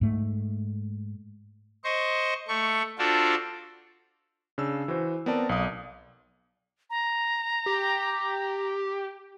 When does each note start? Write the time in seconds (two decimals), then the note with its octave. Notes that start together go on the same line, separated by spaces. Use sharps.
0.01 G#2 A3
1.84 C5 D#5 C#6
2.48 A3 C#6
2.99 D4 F4 F#4 A4 C5 D5
4.58 C#3 D4 E6
4.88 E3 F#4 C5
5.26 B3 C4 A#4 D5 A5
5.49 B1 D5 F5 D#6
6.90 A#5
7.66 G4